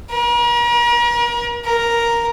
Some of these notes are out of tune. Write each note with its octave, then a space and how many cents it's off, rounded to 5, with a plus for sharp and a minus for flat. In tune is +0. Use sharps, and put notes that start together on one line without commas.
A#4 +40
A#4 +0